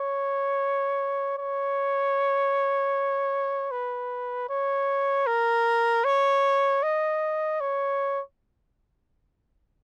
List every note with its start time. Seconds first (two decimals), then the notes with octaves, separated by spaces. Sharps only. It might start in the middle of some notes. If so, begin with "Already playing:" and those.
Already playing: C#5
1.38 C#5
3.71 B4
4.49 C#5
5.26 A#4
6.05 C#5
6.83 D#5
7.61 C#5